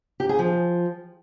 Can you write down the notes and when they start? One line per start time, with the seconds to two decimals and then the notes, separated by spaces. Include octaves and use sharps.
0.20 G4
0.29 G#4
0.39 F3